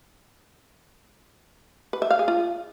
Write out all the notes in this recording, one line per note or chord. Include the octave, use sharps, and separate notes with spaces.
B4
E5
F5
G#4
F4